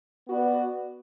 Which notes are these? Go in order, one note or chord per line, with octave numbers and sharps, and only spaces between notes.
B3 F#4 B4 D5